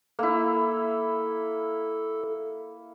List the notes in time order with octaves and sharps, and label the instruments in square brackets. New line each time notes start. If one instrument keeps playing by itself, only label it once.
[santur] A#3 E4 [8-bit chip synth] A4